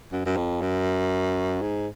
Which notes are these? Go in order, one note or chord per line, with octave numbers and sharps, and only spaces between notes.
F#2
F#2
F2
F#2
G#2